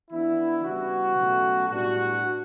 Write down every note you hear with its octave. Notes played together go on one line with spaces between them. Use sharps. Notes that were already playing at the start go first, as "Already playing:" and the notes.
E3 B3 D4 E4
C#3 E3 G3 B3 F#4
B2 F#3 A3 C#4
A2 G3 B3 D4 F#4